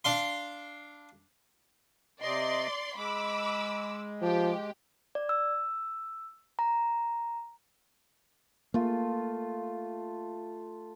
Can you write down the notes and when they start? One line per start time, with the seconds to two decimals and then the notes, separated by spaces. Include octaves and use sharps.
0.04 D4 F5 C6
2.22 C3 D5 D#5 C6
2.96 G#3 B5 D6 E6
4.21 F3 G4
5.15 D5
5.29 E6
6.59 A#5
8.74 A3 A#3 F4